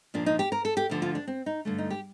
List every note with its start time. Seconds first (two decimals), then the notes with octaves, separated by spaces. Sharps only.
0.14 A#2 F3 A#3 D4
0.26 D#4
0.39 G4
0.52 A#4
0.65 A4
0.77 G4
0.90 D2 D3 F3
1.02 F4
1.15 D4
1.27 C4
1.46 D#4
1.65 G2 D3 A3
1.78 D#4
1.90 G4